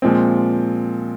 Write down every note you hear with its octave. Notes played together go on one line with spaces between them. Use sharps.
A#2 F3 G#3 C4